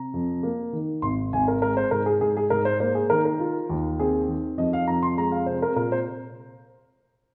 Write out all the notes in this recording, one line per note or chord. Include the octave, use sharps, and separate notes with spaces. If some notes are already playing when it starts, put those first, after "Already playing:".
Already playing: C3 A#5
F2
A#3
D#3
G#1 C6
G#1 G#5
A#4
G#3 A#4
C5
G#2 A#4
G#4
G#2 G#4
G#4
G#2 A#4
C5
A#3 C5
G#4
D#3 A#4
A#4
F4
D#2
C4 G#4
D#3
F2 D#5
F5
F2 A#5
C6
G#3 A#5
F5
C3 C5
A#4
A#2 A#4
C5